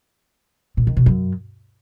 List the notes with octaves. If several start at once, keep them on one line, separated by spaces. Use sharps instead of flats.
A#2
D#3
B2
F#2